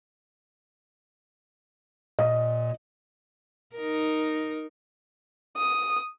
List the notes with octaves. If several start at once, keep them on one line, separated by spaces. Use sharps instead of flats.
A#2 D#5
D#4 A#4
D#6